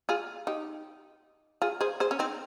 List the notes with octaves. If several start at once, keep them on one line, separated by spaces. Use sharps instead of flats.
F4 G#4
D#4 G4
F4 G#4
G#4 C5
G#4 C5
C#4
C4 D#4